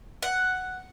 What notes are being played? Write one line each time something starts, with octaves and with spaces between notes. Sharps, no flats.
F#5